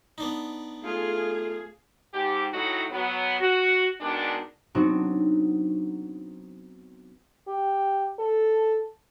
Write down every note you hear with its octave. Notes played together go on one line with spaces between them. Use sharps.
B3 D4 D#4
A3 F4 G#4
G#2 G4
A2 F#3 A3 D#4 E4 F#4
F#3 B3
F#4
B2 D#3 G#3 B3 D4
F#3 B3 C4 D4 D#4 F#4
G4
A4